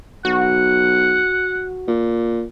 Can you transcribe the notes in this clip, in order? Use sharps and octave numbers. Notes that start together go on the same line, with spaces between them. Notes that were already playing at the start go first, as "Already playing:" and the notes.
B1 F#4 F#5
A#2